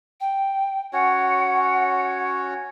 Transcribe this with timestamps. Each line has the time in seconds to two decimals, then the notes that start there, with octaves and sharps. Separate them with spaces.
0.21 G5
0.93 C#4 F#4 C#5 F#5